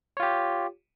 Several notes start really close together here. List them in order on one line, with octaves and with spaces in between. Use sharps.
C#5 F4 G4